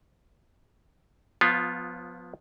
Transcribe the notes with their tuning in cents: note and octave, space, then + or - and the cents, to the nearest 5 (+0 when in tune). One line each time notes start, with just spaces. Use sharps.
F3 +25 B3 +0 F4 +0